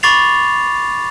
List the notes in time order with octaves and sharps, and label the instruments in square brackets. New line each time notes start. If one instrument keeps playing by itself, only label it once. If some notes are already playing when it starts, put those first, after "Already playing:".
[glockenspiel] B5 C#6 D6 A6 C7 F7